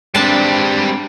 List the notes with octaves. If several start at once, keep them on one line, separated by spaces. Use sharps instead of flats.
G3 G#3 C4 D4 B4 A5